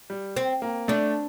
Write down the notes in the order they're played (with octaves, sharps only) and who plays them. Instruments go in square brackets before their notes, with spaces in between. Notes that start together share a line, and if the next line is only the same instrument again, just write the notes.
[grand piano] G3
[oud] C4
[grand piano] A#3
[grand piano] A3 [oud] D4